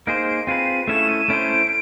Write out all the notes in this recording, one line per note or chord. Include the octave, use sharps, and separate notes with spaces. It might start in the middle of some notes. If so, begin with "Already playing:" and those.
A#3 D#4 G#4 C5 D7
D7
C4 F4 G#4 B4 D#7
A3 C#4 E4 A4 C#5 E7
D#7
A3 C#4 E4 A4 C5 D7